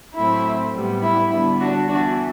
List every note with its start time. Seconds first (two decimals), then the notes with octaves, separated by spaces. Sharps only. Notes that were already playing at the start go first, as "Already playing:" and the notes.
0.14 A2 F#3 A3 C4 E4
0.72 A2 G3 B3
1.02 E4
1.30 D3 G3 B3 E4
1.59 D4 F#4
1.88 E3 B3 D4 F#4